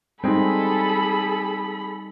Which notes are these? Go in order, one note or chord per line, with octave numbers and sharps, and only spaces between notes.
G3 G#3 C4 D#4 G#4 A4 B5